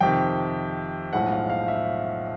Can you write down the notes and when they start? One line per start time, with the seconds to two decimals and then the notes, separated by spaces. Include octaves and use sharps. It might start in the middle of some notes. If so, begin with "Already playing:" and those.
0.01 F2 C3 D#3 G5
1.13 B1 A2 F3 G#3 F#5
1.32 F5
1.50 F5
1.68 E5